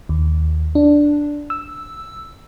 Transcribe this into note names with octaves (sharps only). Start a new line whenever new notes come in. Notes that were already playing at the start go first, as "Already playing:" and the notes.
D#2
D4
E6